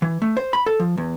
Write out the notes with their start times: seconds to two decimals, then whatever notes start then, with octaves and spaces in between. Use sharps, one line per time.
0.02 E3
0.22 A3
0.37 C5
0.53 B5
0.66 A4
0.80 F3
0.97 E2